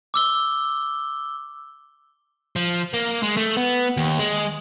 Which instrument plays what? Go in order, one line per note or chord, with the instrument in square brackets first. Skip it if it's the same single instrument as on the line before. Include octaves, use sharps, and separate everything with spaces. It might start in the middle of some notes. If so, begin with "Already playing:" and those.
[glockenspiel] D6 E6 G7
[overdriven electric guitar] F3
A#3
G#3
A3
B3
D#2
G#3